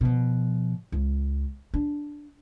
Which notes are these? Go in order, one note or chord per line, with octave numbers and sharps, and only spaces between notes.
B2 F3
C#2
D4